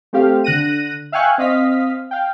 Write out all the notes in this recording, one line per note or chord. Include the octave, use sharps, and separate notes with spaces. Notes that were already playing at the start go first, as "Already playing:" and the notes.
A3 C4 G4 F5
D3 F#6 A#6 D#7
E5 F5 G5 G#5 C#6 F#6
C4 D#5 F5 B6
F5 G5